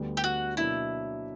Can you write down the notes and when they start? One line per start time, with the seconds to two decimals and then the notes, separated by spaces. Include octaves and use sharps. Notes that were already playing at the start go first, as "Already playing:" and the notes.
Already playing: D2 D3 G3 B3
0.17 G4
0.24 F#4
0.57 B2 F#3 A#3 D4 E4